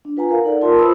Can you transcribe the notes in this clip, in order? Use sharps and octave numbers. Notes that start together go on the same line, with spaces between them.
D4
F4 B4 F#5 G#5 A#5
A#4 F5
D#4 A4 D5 F#5
F4 A#4 E5 A5 C6
F4 B4 C5 B5 D#6 E6